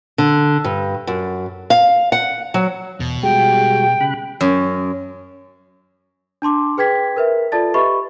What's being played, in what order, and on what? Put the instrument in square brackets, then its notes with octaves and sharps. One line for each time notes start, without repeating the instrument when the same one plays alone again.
[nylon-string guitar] D3
G2
F#2
F5
F#5
F#3
[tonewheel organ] E2 [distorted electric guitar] B2
[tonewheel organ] G3 G#3 F#4 [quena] G5
[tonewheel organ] C#3 B5 F#6
[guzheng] F#2
[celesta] D4 A5 C6 D6
G#4 B4 G5 G#6 B6
A#4 B4 E5
F4 A4 D5 A5 A6
G4 B4 D#5 E5 B5 C#6